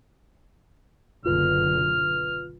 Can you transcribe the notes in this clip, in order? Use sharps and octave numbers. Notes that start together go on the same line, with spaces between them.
F#1 B1 D3 F4 B4 F6